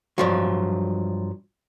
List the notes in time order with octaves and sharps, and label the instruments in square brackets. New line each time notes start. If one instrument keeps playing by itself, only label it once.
[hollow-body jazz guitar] G2 F3 F#3